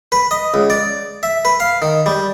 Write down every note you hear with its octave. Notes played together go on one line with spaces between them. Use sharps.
B4
D#5
C#2
D5
E5
B4
F5
D#3
G3